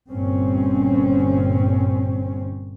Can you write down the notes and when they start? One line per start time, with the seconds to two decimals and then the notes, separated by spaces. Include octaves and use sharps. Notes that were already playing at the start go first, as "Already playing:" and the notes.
0.10 G1 G2 A#2 C4 C#4